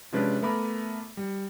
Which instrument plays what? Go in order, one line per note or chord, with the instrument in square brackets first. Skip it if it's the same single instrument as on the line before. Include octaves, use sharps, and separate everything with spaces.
[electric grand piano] C3 F3 G#3 C#4 D4 B4
A3 B3 A#4 B5 D6
G3